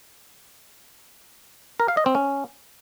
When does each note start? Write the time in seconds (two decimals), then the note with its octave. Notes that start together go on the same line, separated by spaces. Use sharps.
1.80 A#4
1.88 F5
1.97 D#5
2.06 C4
2.15 C#4